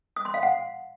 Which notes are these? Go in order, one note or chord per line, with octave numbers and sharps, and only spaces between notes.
D#6
C6
F5
F#5